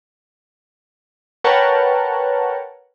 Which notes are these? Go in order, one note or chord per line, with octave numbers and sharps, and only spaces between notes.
A#4 B4 C#5 F#5 G5 A5